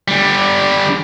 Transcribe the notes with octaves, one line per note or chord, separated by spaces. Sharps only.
D3 G3